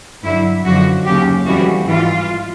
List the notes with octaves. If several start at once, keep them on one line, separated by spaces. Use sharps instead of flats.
G2 D3 F#3 E4
F#2 D3 F3 F#4
D#2 C#3 F#3 G4
F2 C#3 E3 G3 F#4
G#2 E3 G3 F4